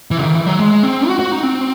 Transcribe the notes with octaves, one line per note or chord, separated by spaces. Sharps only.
E3
C#3
D#3
E3
F#3
G#3
C4
F#4
F#4
D#4
C4